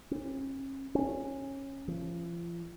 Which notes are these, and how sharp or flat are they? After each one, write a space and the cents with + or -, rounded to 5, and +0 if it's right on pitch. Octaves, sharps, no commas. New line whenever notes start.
C#4 -40
C#4 -20
F3 -40